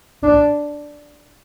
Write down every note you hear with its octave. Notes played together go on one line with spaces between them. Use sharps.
D4